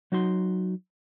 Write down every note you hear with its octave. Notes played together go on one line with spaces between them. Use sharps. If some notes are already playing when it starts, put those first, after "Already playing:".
F#3 D#4 F#4 C6